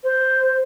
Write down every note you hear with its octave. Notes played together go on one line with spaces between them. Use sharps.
C5